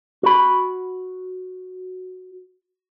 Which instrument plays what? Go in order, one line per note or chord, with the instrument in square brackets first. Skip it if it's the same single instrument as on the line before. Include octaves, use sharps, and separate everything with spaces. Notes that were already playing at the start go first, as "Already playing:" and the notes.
[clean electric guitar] F#4 B5